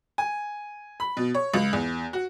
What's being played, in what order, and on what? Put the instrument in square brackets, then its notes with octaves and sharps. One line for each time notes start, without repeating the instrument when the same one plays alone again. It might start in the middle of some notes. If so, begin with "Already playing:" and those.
[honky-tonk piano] G#5
B5
B2
C#5
C#2
E2
F#4